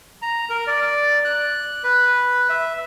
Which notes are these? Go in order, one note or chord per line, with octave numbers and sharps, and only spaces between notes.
A#5
A#4
D5
F#6
B4
E5